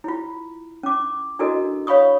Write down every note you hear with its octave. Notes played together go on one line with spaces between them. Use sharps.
E4 F4
C#4 D6
D4 E4 F#4 A4 A#4 D#5
C#5 F5 B5 C#6 D#6